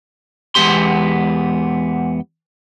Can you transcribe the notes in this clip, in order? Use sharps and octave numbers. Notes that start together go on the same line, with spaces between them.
E2 G#3 B3 G4 C6